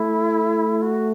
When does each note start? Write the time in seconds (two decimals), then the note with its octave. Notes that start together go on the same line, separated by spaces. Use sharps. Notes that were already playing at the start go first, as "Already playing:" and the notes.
Already playing: A3 E4
0.82 F#4